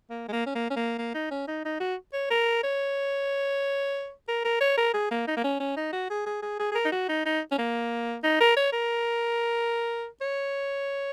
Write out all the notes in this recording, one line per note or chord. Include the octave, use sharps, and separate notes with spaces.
A#3
G#3
A#3
C#4
A#3
C#4
A#3
A#3
D#4
C#4
D#4
D#4
F#4
C#5
A#4
C#5
A#4
A#4
C#5
A#4
G#4
A#3
D#4
A#3
C#4
C#4
D#4
F#4
G#4
G#4
G#4
G#4
G#4
A#4
D#4
F#4
D#4
D#4
C#4
A#3
D#4
A#4
C#5
A#4
C#5